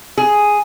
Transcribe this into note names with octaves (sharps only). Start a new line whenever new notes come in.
G#4